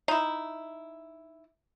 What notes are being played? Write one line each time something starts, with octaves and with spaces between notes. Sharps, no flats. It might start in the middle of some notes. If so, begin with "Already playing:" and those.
D#4 E4